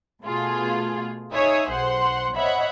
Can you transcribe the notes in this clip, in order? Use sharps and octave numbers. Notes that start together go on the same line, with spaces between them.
B2 A3 F4 G#4
D#4 G#4 C#5 E5 D#6
B1 C5 F#5 C6
C5 C#5 D#5 E5 F#5 B5